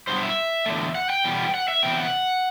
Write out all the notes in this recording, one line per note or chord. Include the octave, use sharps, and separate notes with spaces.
G2 F#3 B3 C5
E5
E2 D3 A3
F#5
G5
E2 B2 G3 B3
F#5
E5
C3 E3 B3 G5
F#5